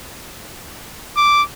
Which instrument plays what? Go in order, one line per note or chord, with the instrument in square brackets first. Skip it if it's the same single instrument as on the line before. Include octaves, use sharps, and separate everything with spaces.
[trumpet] D6